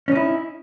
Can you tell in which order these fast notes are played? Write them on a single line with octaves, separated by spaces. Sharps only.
C#4 D#4 E4